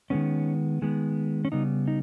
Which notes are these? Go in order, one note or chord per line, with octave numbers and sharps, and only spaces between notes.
D#3 G#3 B3 C#4
D#3 G#3 B3
C#4
C#3 G3 B3 D#4
D#4